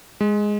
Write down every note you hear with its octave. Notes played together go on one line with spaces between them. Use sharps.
G#3